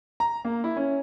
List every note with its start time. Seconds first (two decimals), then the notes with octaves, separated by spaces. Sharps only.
0.20 A#5
0.45 A#3
0.64 E4
0.77 C#4